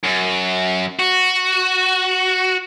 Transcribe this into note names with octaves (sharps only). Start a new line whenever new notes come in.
F#2
F#4